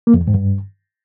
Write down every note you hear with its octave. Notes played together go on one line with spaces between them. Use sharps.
A#3
F2
E2
G#2
G2